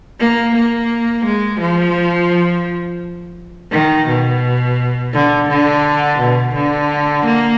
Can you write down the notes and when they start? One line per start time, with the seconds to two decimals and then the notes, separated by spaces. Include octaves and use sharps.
0.19 A#3
0.55 A#3
1.25 G#3
1.60 F3
3.72 D#3
4.08 B2
5.14 D3
5.49 D3
6.20 B2
6.55 D3
7.25 A#3